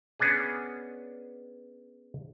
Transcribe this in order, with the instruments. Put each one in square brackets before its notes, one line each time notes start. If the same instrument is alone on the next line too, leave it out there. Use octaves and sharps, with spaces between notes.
[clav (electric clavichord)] B3 C#4 D4 G#4